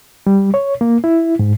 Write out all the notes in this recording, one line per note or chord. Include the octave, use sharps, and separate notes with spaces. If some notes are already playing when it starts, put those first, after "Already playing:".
G3
C#5
A#3
E4
G#2